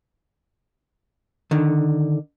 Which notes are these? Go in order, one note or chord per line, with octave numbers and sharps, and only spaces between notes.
D3 D#3